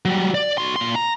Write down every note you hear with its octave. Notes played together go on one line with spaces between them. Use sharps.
F#3 G3
D5
F#4 C6
A#2 C6
A#5